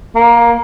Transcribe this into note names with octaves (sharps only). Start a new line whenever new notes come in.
A#3